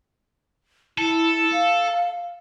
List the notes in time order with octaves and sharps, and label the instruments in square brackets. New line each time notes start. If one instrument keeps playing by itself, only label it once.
[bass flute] E4 [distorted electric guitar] A4
[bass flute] F5